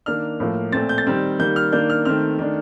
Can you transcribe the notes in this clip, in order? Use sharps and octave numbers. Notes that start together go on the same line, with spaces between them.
D#3 A#3 D4 F6
A2 F3 A#3
A#2 A3 C4 A6
G6
A6
D#3 G3 C4
D#3 G3 A#3 G6
F6
D#3 A#3 D4 G6
F6
D#3 A3 C4 F6
D#3 A3 D4